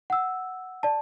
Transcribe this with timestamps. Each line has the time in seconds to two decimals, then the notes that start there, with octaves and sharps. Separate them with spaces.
0.10 F#5 E6
0.83 D5 A5